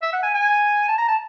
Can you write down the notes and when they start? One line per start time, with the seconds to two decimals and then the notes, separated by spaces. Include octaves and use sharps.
0.02 E5
0.13 F#5
0.23 G#5
0.34 G#5
0.88 A5
0.98 A#5
1.08 A5